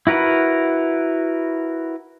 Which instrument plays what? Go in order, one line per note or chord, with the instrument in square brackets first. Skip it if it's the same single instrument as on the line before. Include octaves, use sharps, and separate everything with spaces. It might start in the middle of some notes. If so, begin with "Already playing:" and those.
[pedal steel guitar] E4 F#4 A#4 B4 F#5